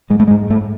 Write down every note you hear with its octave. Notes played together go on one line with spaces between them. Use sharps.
G#2 G#3
A3
G#3
G#2
G#2 A3